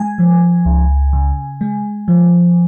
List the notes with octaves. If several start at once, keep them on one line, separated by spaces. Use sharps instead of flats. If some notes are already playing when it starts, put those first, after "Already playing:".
Already playing: G#3 G#5
F3
C#2
C#3
G#3
F3